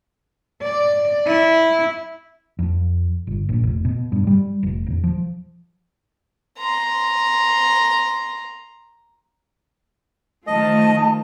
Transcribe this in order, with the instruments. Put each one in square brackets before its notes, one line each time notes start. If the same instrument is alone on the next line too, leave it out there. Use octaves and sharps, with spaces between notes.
[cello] D5
E4
[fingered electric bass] F2
G1
A#1
F1
B2
G2
G3
F1
E1
F3
[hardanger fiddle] A#5 C6
[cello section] D#3 F3 A3 [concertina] D#5 [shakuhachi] A5